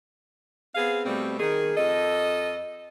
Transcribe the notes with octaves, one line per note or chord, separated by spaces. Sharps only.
B3 C4 G#4 F5
B2 G3 A3 C4
D#3 G#4
F2 A4 D#5